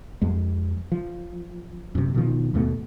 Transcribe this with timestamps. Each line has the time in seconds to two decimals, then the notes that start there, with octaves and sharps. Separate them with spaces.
0.22 F2 G#3
0.92 F3
1.95 F#2 C3
2.14 B2 D#3 F3
2.54 D#2 G#2 B2 A3